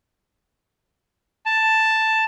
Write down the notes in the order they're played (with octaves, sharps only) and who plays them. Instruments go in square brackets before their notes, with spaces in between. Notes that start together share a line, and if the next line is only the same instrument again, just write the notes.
[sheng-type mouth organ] A5